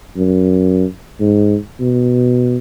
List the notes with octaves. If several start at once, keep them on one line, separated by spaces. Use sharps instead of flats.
F#2
G#2
B2